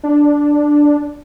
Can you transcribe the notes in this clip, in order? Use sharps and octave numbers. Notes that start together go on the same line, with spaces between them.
D4